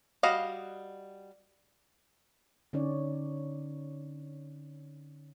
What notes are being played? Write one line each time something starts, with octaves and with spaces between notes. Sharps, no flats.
G3 F#4 D#5 F5
D3 C#4 D#4 C#5 D5